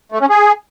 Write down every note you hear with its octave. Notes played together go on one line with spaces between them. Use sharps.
A3
C#4
G#4